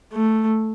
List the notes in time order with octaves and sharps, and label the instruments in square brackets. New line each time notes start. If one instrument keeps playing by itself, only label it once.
[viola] A3